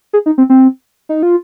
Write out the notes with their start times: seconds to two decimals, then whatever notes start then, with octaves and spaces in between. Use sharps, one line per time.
0.13 G#4
0.26 D#4
0.38 C4
0.50 C4
1.09 D#4
1.23 F4